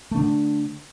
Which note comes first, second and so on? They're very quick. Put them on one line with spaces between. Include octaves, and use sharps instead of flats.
A3 D4 D3